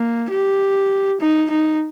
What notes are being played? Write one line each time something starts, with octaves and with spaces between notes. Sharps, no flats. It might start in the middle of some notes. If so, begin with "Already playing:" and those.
Already playing: A#3
G4
D#4
D#4